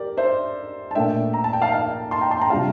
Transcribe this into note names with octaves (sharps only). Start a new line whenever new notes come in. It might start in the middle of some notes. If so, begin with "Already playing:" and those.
Already playing: G4 A#4 D5
C5 E5
A5
A#2 A3 D4 E5 G5
A#5
A5
G5
F5 A5
F5 A5
A5 C6
G5 A#5
A5 C6
G5 A#5
C3 G3 D4 F4 F5 A5